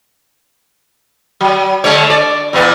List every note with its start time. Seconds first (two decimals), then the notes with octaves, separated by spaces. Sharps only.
1.41 F#3
1.84 D3 G#3 C#5
2.10 D5
2.53 E2 A#2 B3